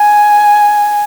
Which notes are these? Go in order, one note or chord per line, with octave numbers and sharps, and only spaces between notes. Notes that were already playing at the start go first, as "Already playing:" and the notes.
Already playing: G#5